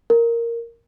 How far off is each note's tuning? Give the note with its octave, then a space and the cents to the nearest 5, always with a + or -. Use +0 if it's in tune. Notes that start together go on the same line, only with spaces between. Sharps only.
A#4 -5